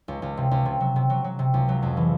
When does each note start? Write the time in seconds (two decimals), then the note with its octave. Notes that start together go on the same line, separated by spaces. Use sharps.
0.08 C#2
0.22 C#2
0.37 C3
0.51 C#2
0.66 C3
0.80 F#3
0.96 C3
1.10 F#3
1.24 F#3
1.39 C3
1.54 C#2
1.69 F#3
1.82 F2
1.97 E3